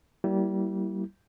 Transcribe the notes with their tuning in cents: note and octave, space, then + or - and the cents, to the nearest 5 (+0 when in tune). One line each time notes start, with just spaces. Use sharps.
G3 -25 A#3 +0 E4 +0